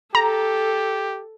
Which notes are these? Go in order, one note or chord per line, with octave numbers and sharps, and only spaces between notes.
G4 A4 A#5